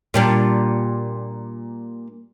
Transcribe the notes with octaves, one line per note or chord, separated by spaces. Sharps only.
A#2 G3 D4